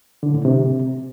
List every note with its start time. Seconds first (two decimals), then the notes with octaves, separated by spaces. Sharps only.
0.23 D3
0.34 A2
0.45 C3